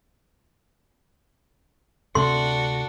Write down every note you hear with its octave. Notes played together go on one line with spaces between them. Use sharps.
D2 C3 A3 D4 F#4 A4 C6